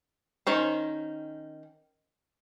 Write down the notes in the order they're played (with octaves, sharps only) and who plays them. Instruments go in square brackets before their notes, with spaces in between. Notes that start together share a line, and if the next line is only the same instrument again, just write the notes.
[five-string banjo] D#3 C#4 C5